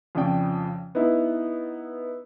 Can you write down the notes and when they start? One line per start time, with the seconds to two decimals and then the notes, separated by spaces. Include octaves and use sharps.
0.15 F2 C#3 F3 D5 G5
0.95 B3 D#4 E4